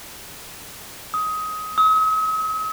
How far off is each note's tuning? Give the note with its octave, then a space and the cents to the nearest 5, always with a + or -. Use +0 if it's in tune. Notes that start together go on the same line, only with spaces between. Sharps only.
D#6 +20
D#6 +45